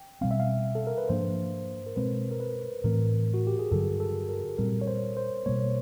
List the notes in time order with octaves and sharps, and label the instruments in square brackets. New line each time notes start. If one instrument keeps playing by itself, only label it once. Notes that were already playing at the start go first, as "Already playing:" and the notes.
Already playing: [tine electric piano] G5
[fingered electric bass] B2 G3 C4 [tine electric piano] F5
[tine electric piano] E5
F5
A4
A#4
B4
[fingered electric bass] G#2 F3 A#3 D4 [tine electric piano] C5
[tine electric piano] A#4
[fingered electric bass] B2 G#3 C4 [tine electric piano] B4
[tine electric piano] A#4
B4
[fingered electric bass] A2 E3 A3 C4 [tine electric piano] A#4
[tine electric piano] F#4
G4
G#4
[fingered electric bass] G2 D3 F#3 [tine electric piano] A4
[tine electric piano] A4
A#4
[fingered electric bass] A#2 G3 C4 [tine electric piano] A#4
[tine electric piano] C#5
C5
C5
[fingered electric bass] B2 G3 A#3 [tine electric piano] C#5